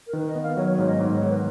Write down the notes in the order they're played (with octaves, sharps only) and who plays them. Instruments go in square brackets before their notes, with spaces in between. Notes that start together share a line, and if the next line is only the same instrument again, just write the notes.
[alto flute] A#4
[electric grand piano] D#3 [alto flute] B4
[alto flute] D#5
[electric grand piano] B3
[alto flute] F5
[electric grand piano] F#3 [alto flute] C#5
[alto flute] C#5
[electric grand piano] G#2
[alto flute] D#5
[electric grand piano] G#2
[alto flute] C#5
[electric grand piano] D#3
[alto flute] B4